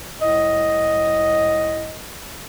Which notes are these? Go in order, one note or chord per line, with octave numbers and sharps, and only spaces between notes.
C2 A2 D#5